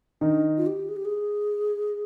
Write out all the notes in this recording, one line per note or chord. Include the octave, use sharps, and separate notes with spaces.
D#3 D4 D#4
F4
G4
G#4
G4
G#4